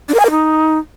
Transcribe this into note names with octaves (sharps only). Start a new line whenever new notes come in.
D4
A#4
G#5
A#4
D#4